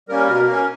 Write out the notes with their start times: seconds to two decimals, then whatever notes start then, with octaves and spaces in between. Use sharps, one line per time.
0.09 G3 A#3 C#4 A#4
0.28 B2 A#4
0.46 A#3 C#4 A#4